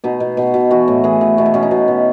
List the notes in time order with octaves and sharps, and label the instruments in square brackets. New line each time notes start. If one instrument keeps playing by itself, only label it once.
[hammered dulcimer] B2 D#4
B2
B2
B2
E3 F#4
A2
E3 G#4
E3
B2 F#4
E4
B2 C#4
D#4
B2
B2